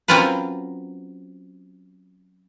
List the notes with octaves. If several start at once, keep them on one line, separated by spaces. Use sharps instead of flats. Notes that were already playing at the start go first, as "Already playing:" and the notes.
F#3 C4 C#4 F4 A#4 B4